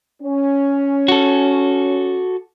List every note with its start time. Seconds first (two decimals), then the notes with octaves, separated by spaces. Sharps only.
0.22 C#4
1.08 F#4 A4